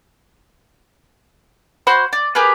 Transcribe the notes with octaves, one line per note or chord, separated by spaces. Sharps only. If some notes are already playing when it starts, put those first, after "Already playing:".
F#4 C5 B5 C6
D5
G4 G#4 A#4 B4